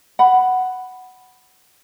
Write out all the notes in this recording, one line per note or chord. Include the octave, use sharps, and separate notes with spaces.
F#5 B5